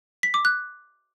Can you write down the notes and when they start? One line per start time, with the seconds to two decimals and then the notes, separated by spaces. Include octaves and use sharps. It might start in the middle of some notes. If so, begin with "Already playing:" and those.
0.23 B6
0.34 D6
0.45 F#6